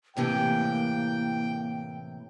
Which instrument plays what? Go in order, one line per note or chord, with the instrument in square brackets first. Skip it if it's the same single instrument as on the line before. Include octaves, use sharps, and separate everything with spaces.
[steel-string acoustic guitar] A2 C3 E3 [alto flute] A#3 [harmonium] G5